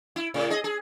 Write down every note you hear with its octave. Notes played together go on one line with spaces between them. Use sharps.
E4
A2 C#3
G#4 D#5
G#4